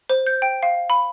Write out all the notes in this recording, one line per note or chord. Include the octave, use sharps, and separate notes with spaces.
C5
G6
G5
F5
B5